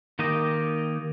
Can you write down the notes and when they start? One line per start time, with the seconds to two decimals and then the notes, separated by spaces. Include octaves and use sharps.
0.19 D#3 A#3 D#4 G4 D#5